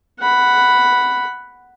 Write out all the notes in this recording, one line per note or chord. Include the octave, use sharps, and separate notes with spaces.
F#5 B5